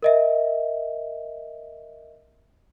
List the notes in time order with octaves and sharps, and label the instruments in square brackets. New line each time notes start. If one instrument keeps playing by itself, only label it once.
[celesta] A#4 D#5 E5